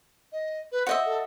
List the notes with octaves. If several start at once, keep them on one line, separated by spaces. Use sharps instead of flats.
D#5
B4
F#4 C5 D#5 E5
A4